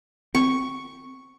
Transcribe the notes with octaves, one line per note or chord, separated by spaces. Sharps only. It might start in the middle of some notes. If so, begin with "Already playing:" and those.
C4 C#6